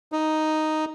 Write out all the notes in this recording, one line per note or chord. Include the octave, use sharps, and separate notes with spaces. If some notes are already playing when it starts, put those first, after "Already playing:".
D#4